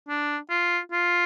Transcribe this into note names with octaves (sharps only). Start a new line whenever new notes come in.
D4
F4
F4